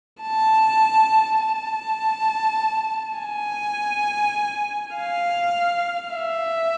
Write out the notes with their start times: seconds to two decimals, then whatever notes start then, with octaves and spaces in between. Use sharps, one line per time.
0.22 A5
1.41 A5
3.19 G#5
4.96 F5
6.14 E5